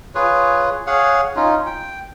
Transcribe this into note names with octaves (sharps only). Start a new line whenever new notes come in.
F4 G#4 B4 C#5
G#4 C#5 F5 F#5
C#4 D#4 F4
G5